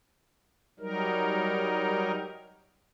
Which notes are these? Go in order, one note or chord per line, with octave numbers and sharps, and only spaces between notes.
F#3 G3 D#4 A#4